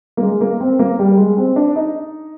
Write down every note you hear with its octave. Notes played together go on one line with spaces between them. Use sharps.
A#3
G#3
A#3
C4
A#3
G3
G#3
C4
D4
D#4